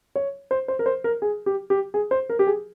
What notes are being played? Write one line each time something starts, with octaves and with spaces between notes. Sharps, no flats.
C#5
C5
C5
A#4
C5
A#4
G#4
G4
G4
G#4
C5
A#4
G4
G#4